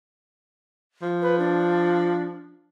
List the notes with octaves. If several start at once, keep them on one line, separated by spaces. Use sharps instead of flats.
F3
B4
D4